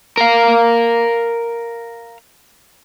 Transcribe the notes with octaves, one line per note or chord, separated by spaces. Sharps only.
A#4 F5